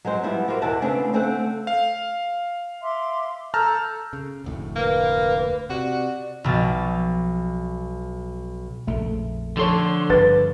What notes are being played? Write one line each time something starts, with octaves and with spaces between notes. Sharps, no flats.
F#3 G#3 C4 C5
F3 G3 B3 E4 F#4
F#4 G4 A#4 C5
E2 B2 E4 A#4 F#5 A5
C#3 A3 B3 C4 D4
C#3 A3 C4 A4 F#5
F5
E5 C6 D6
A4 A5 A#5 E6 F6 G6
C#3
F1 D2 A2
A#3 B4
C3 F#4 D5
B1 B2 F3 A6
A#1 F2 C#3 A3
D3 F3 A4 C#5 C6
G1 C#3 B4 A6